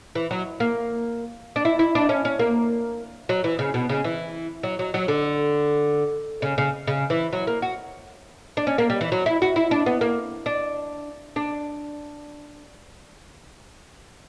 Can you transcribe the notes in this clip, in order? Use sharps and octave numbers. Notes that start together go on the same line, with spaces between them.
E3
F#3
A#3
D4
E4
E4
D4
C#4
C#4
A#3
F#3
E3
C#3
B2
C#3
E3
F#3
F#3
F#3
D3
C#3
C#3
C#3
E3
F#3
A#3
F#4
D4
C#4
A#3
G3
E3
F#3
E4
F#4
E4
D4
B3
A#3
D4
D4